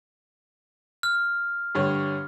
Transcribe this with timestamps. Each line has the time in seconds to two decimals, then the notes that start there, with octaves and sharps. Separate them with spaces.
1.03 F6
1.75 G2 D3 C#5